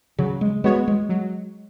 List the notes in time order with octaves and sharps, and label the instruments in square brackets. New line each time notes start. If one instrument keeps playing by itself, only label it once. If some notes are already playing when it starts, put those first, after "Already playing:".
[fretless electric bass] C#3 [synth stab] F#3
[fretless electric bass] G#3
[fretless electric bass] G#3 [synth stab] B3 F#4 C#5
[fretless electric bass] G#3
[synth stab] F#3